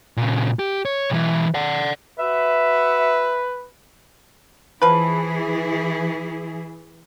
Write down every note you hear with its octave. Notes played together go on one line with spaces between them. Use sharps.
A#2 C#3
G4
C#5
B1 E3
D5 F#5
F#4 B4 E5
E3 F3 E4 G#4 B4